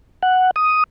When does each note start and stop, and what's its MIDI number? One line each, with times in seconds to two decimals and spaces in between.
0.23 0.51 78
0.56 0.84 87